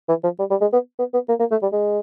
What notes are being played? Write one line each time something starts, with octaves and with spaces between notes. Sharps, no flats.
E3
F3
G3
G3
G#3
B3
B3
B3
A#3
A#3
A3
G3
G#3